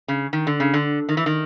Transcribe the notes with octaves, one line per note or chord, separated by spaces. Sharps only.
C#3
D#3
D3
C#3
D3
D#3
E3
D#3